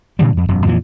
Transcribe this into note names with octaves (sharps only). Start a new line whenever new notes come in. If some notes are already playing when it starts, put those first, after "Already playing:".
A#2 D3 E3 G3
F2
E1 F#2
F2 A#2 E3 F3